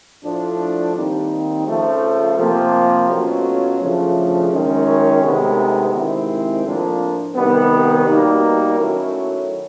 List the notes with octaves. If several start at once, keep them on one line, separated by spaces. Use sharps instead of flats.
A2 F3 A3 D4
D#2 D#3 G3 C4 D#4
C#3 F3 A3
C3 F3 A#3
B2 F#3 A3 C#4 F4
D2 C#3 F3 A3 D4
F#2 D#3 G#3 C#4
D2 C3 D#3 G#3 B3
C3 D#3 G#3 C4 E4
A2 F3 A#3 D4 F4
C2 C3 D#3 G3 B3
B2 G3 A#3 D#4
D#3 F#3 A3 C#4 E4